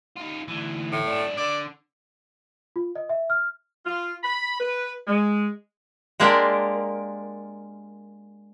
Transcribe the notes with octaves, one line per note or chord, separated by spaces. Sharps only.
D#4 F4
D2 E3
A2
F#2 D4
D3 D5
F4
D#5
E5
F6
F4
B5
B4
G#3
G#3 A#3 D4 F4 G4 A#4